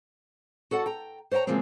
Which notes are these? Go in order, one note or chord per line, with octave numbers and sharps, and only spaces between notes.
F#4 A4 D5 F#5
G5 A#5
C5 C#5 D#5 G5 A#5
C#3 E3 F3 G#3 A#3 C4